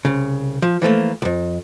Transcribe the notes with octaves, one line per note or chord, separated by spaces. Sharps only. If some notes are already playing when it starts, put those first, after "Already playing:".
C2 C#3
F3
E3 F3 A3 A#3
B1 F2